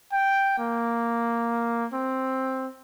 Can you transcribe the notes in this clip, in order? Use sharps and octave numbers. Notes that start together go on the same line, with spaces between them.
G5
A#3
C4